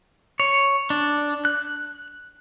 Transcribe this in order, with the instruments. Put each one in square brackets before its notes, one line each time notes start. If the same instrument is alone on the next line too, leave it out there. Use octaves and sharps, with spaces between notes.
[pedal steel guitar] C#5
D4
F#6